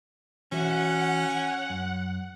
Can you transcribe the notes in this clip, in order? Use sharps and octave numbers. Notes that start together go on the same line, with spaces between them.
E3 C#4 F#4 E5 F#5
F#2